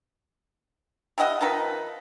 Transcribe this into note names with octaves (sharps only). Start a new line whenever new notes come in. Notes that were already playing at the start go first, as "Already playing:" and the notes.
G3 E4 D#5 F#5
D#3 F3 D#4 B4